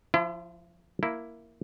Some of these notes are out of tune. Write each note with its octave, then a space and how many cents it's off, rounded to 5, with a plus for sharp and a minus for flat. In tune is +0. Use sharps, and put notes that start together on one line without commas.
F3 +0 E4 +40
A#3 +0 E4 +5